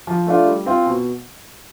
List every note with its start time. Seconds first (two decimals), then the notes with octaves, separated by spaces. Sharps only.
0.07 F3
0.27 A3 D4 F4
0.46 G3
0.66 C4 F4
0.86 B2